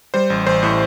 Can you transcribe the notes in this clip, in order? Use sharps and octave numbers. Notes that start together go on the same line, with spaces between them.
G3 C5
A1
A1 C5
A2